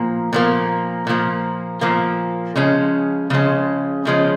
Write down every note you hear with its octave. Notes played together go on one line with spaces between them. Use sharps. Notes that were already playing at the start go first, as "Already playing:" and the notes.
Already playing: A#2 F3 A#3
A#2 F3 A#3
A#2 F3 A#3
A#2 F3 A#3
C#3 F3 G#3 C#4
C#3 F3 G#3 C#4
C#3 F3 G#3 C#4